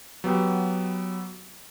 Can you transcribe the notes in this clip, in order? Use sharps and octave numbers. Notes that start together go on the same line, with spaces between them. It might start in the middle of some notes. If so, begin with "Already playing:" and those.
F#3 B3 G4